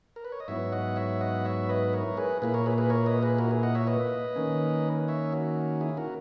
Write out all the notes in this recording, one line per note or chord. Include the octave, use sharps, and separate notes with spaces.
A#4
B4
C#5
D#5
G#2 F#3 B3 E4 C#5 E5
D#5 F#5
C#5 E5
D#5 F#5
C#5 E5
B4 D#5
A#4 C#5
G#4 B4
A#2 A#3 E4 G#4 B4
A#4 C#5
G#4 B4
G#4 B4
A#4 C#5
B4 D#5
G#4 B4
F#4 A#4
E4 G#4
D#5 F#5
C#5 E5
B4 D#5
D#3 A#3 C#4
C#5 E5
F#4
E4 G#4
F#4 A#4